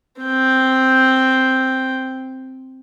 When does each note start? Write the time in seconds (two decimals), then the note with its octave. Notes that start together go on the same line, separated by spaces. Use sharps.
0.21 C4 G5